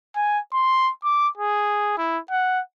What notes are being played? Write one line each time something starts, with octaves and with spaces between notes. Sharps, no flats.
G#5
C6
D6
G#4
E4
F#5